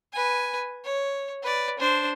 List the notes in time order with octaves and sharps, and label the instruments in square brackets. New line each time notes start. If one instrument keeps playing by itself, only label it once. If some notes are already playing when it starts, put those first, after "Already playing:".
[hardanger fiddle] B4 G#5
C#5
B4 D5
D4 C5